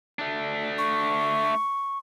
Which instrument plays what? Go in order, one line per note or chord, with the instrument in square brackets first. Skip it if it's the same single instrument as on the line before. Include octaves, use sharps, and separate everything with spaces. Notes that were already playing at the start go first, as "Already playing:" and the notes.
[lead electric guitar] A3 D4
[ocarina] C#6